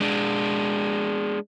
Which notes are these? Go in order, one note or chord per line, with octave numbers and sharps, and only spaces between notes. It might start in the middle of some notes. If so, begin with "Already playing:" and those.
G#3 D4